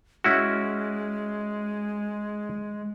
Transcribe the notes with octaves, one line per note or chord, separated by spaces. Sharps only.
G#3 C#4 E4 F#4